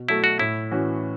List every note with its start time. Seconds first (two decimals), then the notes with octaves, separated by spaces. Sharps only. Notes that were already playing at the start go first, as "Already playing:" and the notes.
Already playing: B2
0.08 F#3 A3 E4 F#4 A4
0.24 F#4
0.39 A2 E4
0.71 E3 C#4 F#4